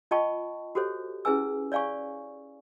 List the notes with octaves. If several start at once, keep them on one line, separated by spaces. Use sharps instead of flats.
F4 D#5 G5 A5 B5 C#6
F#4 G4 A4 C5 C#5
C#4 E4 G#4 B4 G#5 E6
C#5 D5 F5 G#5 C#6